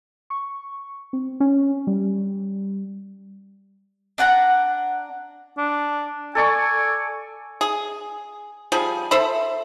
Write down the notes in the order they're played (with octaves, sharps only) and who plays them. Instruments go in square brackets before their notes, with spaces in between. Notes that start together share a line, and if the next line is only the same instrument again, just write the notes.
[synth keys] C#6
C4
C#4
G3
[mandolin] D4 F#5 A5 A#5
[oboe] D4
[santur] A4 D5 C#6 [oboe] G#5
[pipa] G#4
F3 G3 G#4
A4 C5 E5 B5